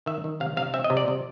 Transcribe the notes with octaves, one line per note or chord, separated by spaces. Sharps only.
D#3 E5
D#3
C3 F5
C3 F5
C4 E5
D#5
C3
D5
C3